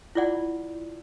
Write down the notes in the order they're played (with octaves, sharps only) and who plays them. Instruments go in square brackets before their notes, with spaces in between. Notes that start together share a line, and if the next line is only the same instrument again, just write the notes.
[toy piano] E4 F4 D5 F#5